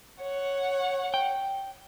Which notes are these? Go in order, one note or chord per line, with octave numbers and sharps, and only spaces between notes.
C#5 F#5
G5